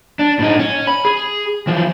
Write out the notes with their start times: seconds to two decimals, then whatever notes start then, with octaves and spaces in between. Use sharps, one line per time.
0.19 D4
0.39 A2 D#4
0.59 C#4
0.87 B5
1.05 G#4
1.67 E3 F3